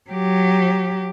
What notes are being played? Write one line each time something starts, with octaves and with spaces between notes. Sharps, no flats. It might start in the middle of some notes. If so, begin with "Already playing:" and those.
F#3 G4